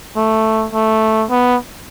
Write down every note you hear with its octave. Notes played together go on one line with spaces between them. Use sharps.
A3
A3
B3